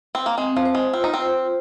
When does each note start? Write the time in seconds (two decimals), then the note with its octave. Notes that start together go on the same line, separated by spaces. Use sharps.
0.15 C4
0.26 A#3
0.38 G#3 C4
0.57 F3
0.66 C5
0.75 G#3
0.93 C4 F4
1.04 D#4
1.14 C4
1.22 C5